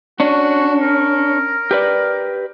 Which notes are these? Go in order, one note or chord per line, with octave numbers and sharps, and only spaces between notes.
C#4 D4 F#4
A#4
G4 B4 D5